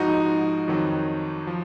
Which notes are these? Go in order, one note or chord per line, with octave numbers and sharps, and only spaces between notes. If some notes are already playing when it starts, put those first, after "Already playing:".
Already playing: G#2 F3 D#4 F#4
F2 D#3 F#3
F3